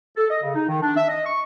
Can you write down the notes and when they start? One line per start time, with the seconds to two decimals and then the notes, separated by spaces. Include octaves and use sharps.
0.17 A4
0.30 D#5
0.43 C#3
0.55 D#4
0.69 D#3
0.82 D4
0.97 E5
1.08 D#5
1.26 C#6